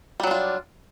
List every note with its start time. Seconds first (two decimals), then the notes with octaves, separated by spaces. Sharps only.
0.20 G3
0.23 F#3
0.27 D4
0.31 F4